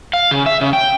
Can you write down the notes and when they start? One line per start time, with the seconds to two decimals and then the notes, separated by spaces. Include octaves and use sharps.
0.13 F5
0.31 C#3
0.46 E5
0.61 C#3
0.73 G5